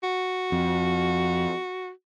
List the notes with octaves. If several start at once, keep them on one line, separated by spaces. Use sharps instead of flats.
F#4
F2